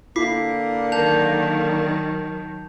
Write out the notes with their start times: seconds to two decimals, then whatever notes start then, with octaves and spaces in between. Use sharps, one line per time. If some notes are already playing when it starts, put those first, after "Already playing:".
0.16 D3 A#3 E4 D6 B6 C7
0.92 D#3 F#3 A#4 A5 G6 F7